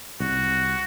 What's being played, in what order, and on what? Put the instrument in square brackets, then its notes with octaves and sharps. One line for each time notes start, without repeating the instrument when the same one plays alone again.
[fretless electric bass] C2 [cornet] F#4